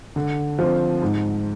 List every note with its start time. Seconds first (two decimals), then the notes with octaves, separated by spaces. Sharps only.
0.16 D3
0.59 F3 C4
1.02 G#2